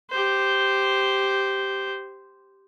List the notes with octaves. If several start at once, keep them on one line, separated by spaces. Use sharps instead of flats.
G4 C5